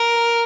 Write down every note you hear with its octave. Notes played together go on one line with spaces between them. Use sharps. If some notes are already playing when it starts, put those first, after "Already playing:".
Already playing: A#4